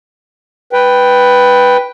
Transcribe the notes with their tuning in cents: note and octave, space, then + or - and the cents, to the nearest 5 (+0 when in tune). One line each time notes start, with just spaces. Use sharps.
B4 +0 G5 +0